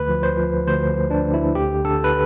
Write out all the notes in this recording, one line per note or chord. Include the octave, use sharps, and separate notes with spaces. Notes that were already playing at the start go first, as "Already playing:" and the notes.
Already playing: D2 B4
F3
C5
F3
D2 C5
D2
D4
D2
E4
D3 G4
D3 A4
B4